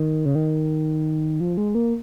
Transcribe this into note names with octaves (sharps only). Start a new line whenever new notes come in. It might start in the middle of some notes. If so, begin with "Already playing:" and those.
Already playing: D#3
C#3
D#3
F3
G#3
A#3